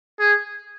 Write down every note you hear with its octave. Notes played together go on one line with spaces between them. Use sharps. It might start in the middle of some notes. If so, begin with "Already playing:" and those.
G#4